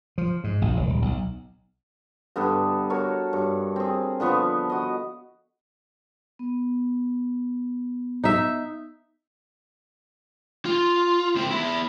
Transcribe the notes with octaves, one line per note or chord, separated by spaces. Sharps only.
F3
G#2
A#1
E1
D#1
B1
G2 D3 B3 A4
F#4 A4 A#4 C#5
G2 C#5
C4 G#4
D3 F3 B3 C#6
F#4 D#5
B3
D#4 E5
F4
C#2 C4
B3 E4